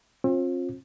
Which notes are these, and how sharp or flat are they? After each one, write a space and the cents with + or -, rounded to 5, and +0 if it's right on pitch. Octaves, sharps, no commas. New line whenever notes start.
C4 +35 F4 +20